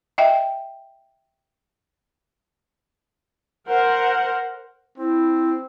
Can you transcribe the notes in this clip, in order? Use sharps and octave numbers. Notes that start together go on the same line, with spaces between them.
D#5 E5 G5
A#4 C5 F#5
C4 E4